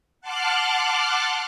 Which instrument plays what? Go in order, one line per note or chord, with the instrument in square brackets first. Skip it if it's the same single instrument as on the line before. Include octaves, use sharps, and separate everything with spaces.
[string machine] F#5 A5 C6 D6 F6 F#6